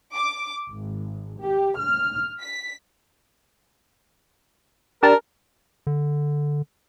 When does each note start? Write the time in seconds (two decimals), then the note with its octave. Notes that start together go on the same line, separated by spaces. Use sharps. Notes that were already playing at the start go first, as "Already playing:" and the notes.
0.14 D6
0.67 G#1
1.38 G4
1.77 F6
2.40 B6
5.03 D4 G4 A#4 A5
5.87 D3